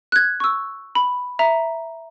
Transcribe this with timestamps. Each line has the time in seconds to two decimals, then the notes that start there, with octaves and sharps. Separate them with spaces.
0.12 F#6 G#6
0.40 C#6 E6
0.95 B5
1.39 E5 A#5